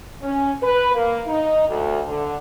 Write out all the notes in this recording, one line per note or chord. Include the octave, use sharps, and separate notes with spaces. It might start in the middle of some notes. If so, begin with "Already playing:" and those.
C#4
B4
A#3
D#4
D2
D3